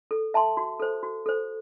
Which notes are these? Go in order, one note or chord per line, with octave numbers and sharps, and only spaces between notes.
A4
E5 A5 C6
F#4
A4 C5
F#4
A4 C5